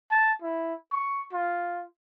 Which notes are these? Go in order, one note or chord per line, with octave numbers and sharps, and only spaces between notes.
A5
E4
C#6
F4